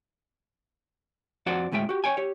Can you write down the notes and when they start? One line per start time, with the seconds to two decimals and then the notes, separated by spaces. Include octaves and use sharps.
1.46 F2 F#4 C5 D5 F#5
1.72 D2 A2 G#3 E5 G5
1.89 F#4 G4
2.04 C#5 G5 G#5
2.17 G4 C#5